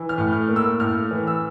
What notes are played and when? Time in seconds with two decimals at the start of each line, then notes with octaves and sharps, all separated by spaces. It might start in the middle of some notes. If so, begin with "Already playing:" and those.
Already playing: E3
0.09 F6
0.18 A2
0.33 F6
0.49 A#3
0.56 E6
0.80 A2 F6
1.11 E3
1.27 E6